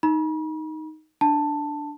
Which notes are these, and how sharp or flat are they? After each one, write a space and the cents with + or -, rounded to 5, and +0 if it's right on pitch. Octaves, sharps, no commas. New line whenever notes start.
D#4 +5 B5 -45
D4 +0 A5 +10